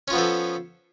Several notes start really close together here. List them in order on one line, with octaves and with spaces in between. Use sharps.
C#4 F4 B3 F3 A4